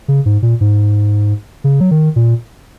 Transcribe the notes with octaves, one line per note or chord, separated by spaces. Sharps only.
C#3
G#2
A#2
G#2
C#3
F#3
D#3
A#2